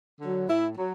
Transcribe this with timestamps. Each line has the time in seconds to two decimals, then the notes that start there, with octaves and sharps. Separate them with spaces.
0.21 D3 F#3
0.48 A2 E4
0.77 F#3